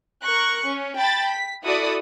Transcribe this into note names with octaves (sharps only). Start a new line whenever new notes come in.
A#4 C#6 F#6
C#4
G5 A5 B5 A6
B6
E4 F#4 A4 D5 D#6